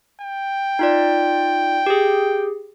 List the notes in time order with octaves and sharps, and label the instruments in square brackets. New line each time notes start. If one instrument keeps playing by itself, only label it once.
[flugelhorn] G5
[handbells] D#4 F4 D5
G4 G#4